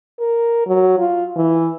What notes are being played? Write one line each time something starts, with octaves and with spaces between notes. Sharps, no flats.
A#4
F#3
F4
E3